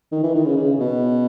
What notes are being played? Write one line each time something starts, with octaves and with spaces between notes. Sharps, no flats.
D#3
E3
D#3
C#3
C#3
B2